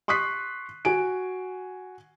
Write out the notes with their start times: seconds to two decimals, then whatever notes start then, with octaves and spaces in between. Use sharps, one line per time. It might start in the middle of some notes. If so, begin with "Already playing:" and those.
0.08 C6 C#6 D#6 F#6 B6 C7
0.85 F#4 G#5 D7